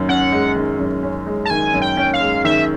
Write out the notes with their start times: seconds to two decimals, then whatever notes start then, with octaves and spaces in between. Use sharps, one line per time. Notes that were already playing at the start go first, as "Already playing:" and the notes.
Already playing: F#2 D#3
0.09 C#4 F#5
0.32 G#3
0.56 D#3
0.79 F#2
1.03 C#4
1.27 G#3
1.45 A5
1.50 D#3 G#5
1.74 F#2
1.82 G5
1.97 C#4
2.14 F5
2.21 G#3
2.44 D#3 E5